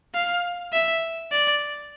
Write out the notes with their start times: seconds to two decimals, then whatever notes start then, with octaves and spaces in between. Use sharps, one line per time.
0.14 F5
0.73 E5
1.32 D5